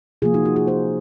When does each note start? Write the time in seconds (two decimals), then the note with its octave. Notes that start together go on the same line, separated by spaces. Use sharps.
0.22 C3 F3 A#3 F4 G#4
0.34 D#4 F#4
0.45 D#4 F#4
0.56 F4 G#4
0.67 G#4 C5